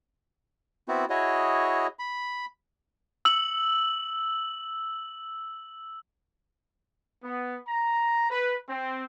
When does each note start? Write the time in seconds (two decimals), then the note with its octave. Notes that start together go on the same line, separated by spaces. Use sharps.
0.88 B3 C4 E4 F#4
1.10 E4 F#4 G#4 C#5 D#5
1.99 B5
3.25 E6 F#7
7.23 B3
7.67 A#5
8.30 B4
8.68 C4